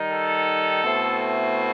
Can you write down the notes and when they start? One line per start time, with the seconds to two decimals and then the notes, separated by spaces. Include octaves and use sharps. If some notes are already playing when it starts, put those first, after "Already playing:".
Already playing: D#3 G3 D#4
0.10 A4
0.83 B2 A3 C4 E4